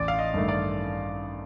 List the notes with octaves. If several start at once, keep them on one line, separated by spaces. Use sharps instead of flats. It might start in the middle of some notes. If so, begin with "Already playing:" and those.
Already playing: A1 D5
F5
D#5
G2 D#3 A3
D5